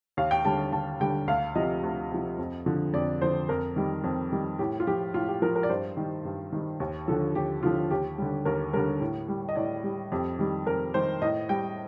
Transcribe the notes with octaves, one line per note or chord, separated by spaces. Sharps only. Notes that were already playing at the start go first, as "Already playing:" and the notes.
D#2 F5
G5
D3 G3 A5
D#2 A5
D3 G3 G5
D2 F5
C3 F3 D#5
D2
C3 F3
F2
D3 F3
F2 D5
D3 F3 C5
F2 A#4
D#3 G3
F2
D#3 G3
A2 G4
F4
F3 G4
A2 F4
G4
F3 A#4
A#4
D5
G2 C5
D#3 G3
G2
D#3 G3
D#2
D3 F3 A4
D#2 G4
D3 F3 F4
D#2 G4
D3 G3
D#2 A#4
D3 G3 A#4
A2
G3
D#5
A2 D5
G3
F2 G4
D#3 G3
F2 A#4
D#3 G3 C5
A2 D#5
G3 G5